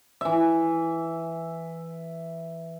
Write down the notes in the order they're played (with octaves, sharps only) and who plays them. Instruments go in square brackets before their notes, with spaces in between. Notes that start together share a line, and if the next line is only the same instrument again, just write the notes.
[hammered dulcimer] E3 E5